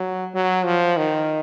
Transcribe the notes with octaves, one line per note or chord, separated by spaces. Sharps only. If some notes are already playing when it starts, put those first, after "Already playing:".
Already playing: F#3
F#3
F3
D#3